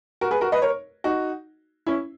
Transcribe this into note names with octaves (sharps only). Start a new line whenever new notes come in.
F#4 A#4
G#4 B4
F#4 A#4
B4 D#5
A#4 C#5
D#4 F#4
C#4 E4